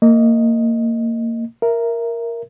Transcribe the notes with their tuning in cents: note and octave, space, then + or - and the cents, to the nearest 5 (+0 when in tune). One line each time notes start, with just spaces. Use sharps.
A#3 -25 D#5 +0
A#4 +0 E5 +10